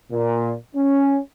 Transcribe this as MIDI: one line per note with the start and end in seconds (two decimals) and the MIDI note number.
0.12 0.53 46
0.76 1.19 61